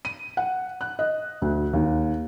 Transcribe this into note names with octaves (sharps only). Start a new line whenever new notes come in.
D#7
F#5
F#6
D#5
D2
D#2